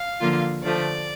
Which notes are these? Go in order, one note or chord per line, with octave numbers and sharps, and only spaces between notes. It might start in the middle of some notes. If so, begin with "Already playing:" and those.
Already playing: F5
D3 F3 A#3 F4
D3 F3 A3 D5